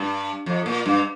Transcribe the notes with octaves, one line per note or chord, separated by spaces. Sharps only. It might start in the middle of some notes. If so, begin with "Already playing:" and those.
Already playing: G2
F2
A#2
G2